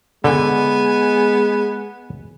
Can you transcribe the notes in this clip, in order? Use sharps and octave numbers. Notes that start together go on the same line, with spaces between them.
D3 G#3 B3 G#5